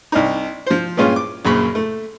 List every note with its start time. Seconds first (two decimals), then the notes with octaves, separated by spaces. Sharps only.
0.12 C2 D4 D#4
0.67 F3 C5
0.97 G2 A#2 G#3 C#4 F4
1.16 D6
1.45 A#1 F#2 A#2 C#3 B5 C#6
1.75 A3